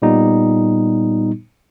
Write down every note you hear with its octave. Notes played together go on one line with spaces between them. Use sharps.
A#2 G3 B3 D#4